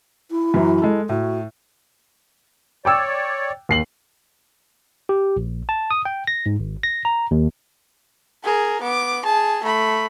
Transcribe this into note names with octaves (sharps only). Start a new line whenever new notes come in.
E4
F#2 E3 F#3
G#3 A4
A2 F#4
C#5 D5 G5 D6 E6
D#2 C7 F#7
G4
A#1
A5
D#6
G5
A#6
G#2
G#1
A#6
A#5
D#2
G#4 A#4
B3 D6
G#4 A5
A3 B5